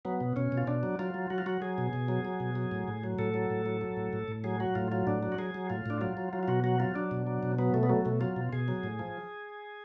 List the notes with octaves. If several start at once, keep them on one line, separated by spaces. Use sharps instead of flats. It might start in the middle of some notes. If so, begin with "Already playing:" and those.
F#3 B3
B2
B2 C#4
B2
F4
B2 D4
F#3
F#3 F4
F#3
F#3 F#4
F4
F#3 F#4
F#3 G#4
B2
B2
F#3
F#3
B2
F#3
A2
A2
F#3
A2 A4
F#3
A2
F#3
F#3
A2
A2
A2
F#3 G#4
F#3 F#4
A2 F4
F#3 F4
A2 D4
F#3
F#4
F#3 G#4
F#3
A2 F4
A2 D4
F#3 F4
F#3
F#3 F4
F4
B2 F#4
F#3 F#4
F#3 F4
F#3 D4
B2
F#3
B2
F#3 B3
B2 A3
B3
F#3 A3
B2 A3
F#3 F4
B2
B2 G#4
F#3
A2
F3